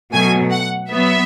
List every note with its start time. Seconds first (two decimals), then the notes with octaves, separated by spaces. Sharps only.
0.13 B2 F#3 A3 G#5
0.52 F#5
0.92 F#3 B3 E5